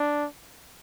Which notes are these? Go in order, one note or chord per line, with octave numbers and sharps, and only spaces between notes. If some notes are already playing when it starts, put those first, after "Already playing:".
Already playing: D4